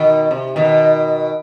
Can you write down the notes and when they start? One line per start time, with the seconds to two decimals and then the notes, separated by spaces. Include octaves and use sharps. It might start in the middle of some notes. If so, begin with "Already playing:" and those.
Already playing: B2 D#3
0.31 C3
0.56 B2 D#3